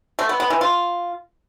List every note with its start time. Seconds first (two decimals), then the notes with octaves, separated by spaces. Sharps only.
0.19 A3
0.29 B3
0.40 B3
0.50 E3
0.61 F4